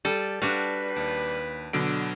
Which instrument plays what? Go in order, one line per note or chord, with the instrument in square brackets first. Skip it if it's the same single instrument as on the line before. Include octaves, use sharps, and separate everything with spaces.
[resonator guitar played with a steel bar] G3 [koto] A4
[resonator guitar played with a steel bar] G3 [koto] D4 F#4 F5 [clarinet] B4
[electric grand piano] D#2
[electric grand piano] B2 F#3 D7 [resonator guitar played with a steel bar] D3